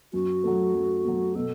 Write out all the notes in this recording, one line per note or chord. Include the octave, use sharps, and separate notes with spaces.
F#2 F#4
F#3 A3
F#2
F#3 A3
B2 A4